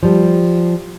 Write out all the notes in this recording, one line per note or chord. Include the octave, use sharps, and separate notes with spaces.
F3 G3